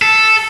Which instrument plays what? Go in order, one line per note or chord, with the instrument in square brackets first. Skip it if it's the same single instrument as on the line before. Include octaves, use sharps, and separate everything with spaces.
[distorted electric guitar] A4